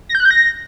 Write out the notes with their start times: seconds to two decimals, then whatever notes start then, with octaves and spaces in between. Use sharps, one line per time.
0.09 A#6
0.15 G6
0.20 F#6
0.25 G6
0.31 A#6